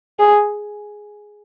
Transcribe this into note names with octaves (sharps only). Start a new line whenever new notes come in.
G#4